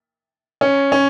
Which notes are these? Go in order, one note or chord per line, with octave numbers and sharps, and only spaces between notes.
C#4
C#4